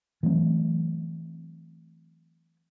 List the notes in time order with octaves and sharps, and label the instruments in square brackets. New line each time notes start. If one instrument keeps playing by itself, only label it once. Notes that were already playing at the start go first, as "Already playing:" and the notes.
[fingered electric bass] E3 F#3 A3 C4